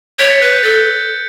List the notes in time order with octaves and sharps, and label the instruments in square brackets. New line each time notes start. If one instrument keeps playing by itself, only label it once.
[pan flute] C#5 [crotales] B6 D7
[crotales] A6 C#7
[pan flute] B4 [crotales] F#6
[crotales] G6
[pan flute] A4 [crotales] A6
[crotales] G6